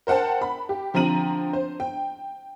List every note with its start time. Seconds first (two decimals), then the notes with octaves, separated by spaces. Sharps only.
0.07 A#4 C5 F#5 G5 A5
0.41 B5
0.69 G4
0.94 D3 F3 C4 A#5 D#7 F#7
1.53 C5
1.80 G5